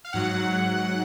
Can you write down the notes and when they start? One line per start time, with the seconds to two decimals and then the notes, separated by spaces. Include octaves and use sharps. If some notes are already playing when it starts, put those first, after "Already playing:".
0.05 F5
0.13 G#2 F#3 F#5